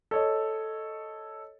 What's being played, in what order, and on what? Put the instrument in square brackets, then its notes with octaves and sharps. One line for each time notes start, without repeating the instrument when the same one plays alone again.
[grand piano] A4 C#5 D#5